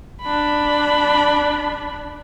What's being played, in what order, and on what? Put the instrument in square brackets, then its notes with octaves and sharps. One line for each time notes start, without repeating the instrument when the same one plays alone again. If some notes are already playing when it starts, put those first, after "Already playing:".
[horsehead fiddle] D4 B5